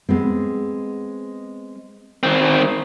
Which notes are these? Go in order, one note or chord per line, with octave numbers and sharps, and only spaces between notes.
G#3 B3 C4
D#3 C4